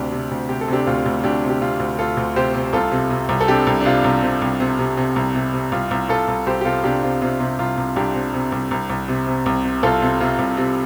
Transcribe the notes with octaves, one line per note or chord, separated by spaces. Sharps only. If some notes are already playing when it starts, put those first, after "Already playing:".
Already playing: D2 C3 D4 G4
C3
D2
C3 G4
A4
C3 D4 G4
D2 F4
D2
D2 D4 G4
C3
G4
C3 F4
D2
D2 F4 A4
D2
C3 G4 C5
C3
C2 F4 A4
C3
C3
C2
A4
C3 D4 G4
C2
D4
C3 F4
C2
C3
C2
C3
C3
C3
C2
C3
C3
C2 F4
C2
C2 F4 A4
C2
C2 G4 C5
G4
C3 F4 A4
C3 D4 G4
C3 F4
C3 F4
C3
C2 F4
C2
C2 D4 G4
C3
C3
C2
C2
C2
C3
C3
C2
C3
C2 F4 A4
C3
C3 F4
C2
C3